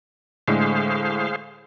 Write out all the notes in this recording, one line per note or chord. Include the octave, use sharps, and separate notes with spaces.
A2 D3 G#3 G#4 C5 F5